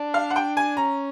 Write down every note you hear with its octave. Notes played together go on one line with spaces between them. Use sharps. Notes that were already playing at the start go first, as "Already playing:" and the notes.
Already playing: D4
F5
F#5
G5
G#5
C#4 A#5